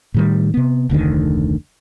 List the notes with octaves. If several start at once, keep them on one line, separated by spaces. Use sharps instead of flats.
A2 D#3 G3
C3 B3
F1 D2 D3 D#3